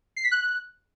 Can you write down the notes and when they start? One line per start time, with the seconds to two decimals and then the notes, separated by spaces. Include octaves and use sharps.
0.17 C7
0.24 B6
0.31 F#6